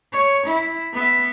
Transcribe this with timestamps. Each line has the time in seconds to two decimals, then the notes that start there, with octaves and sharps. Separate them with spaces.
0.12 C#5
0.46 E4
0.93 B3 E5